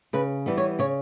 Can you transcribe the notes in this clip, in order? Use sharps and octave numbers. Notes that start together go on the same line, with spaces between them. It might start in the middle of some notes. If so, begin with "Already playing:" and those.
C#3 B4
E3 G3 B3
C#5
C#3 C#5